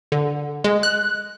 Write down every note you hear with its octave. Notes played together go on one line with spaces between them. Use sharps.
D3
G#3
F#6